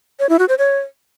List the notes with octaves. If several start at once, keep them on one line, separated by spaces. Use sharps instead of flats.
C#5
E4
F#4
C5
C#5